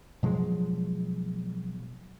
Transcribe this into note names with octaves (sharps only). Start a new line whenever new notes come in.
B2 F3 F#3 G#3